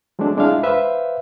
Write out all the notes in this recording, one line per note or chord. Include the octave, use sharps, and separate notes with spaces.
F#3 G#3 A3 C4 D4
G#3 D4 E4 F4 E5 F5
B4 C5 E5 F5